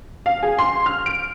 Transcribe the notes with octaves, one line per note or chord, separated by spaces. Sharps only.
F5
G#4
C6
F6
D7